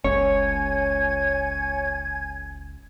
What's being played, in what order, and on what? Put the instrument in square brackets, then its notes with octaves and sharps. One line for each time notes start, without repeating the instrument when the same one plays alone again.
[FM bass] F#1 [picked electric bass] C#2 G#3 C#4 [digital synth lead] C#5 [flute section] G#5 G#6